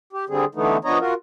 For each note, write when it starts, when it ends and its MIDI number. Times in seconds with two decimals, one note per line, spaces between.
0.13 0.25 67
0.29 0.45 50
0.29 0.45 55
0.29 0.45 60
0.29 0.45 68
0.55 0.77 50
0.55 0.77 52
0.55 0.77 57
0.55 0.77 59
0.55 0.77 63
0.85 0.98 53
0.85 0.98 59
0.85 0.98 62
0.85 0.98 73
0.85 0.98 75
0.85 0.98 82
1.00 1.14 65
1.00 1.14 66
1.00 1.14 70